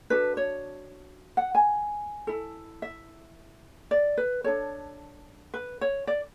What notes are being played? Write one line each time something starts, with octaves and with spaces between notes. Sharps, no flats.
D4 F#4 A4 B4
C#5
F#5
G#5
E4 A4
E5
D5
B4
D4 A4 C#5
B4
C#5
D5